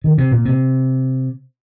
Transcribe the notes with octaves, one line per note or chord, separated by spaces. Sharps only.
D#3
C3
A#2
C3